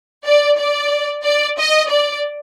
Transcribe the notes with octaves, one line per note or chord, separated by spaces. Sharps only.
D5
D5
D5
D#5
D5